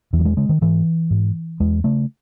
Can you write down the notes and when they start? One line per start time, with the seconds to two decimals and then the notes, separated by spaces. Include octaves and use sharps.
0.13 E2 E3
0.19 F#3
0.25 G#3
0.37 C#3 G#3
0.49 D#3
0.61 G#2 E3
1.11 G#2
1.60 E2 G#3
1.84 C#3 A3